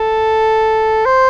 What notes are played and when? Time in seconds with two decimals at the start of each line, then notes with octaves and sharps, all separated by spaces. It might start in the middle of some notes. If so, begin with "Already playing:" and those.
Already playing: A4
1.06 C5